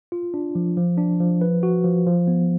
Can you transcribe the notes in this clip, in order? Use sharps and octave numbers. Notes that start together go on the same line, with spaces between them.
F4
D4
F3
F3
D4
F3
B4
F#4
F3
F3
B3